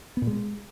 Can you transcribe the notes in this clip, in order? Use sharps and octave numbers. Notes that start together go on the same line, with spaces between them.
B3
A#2
G#3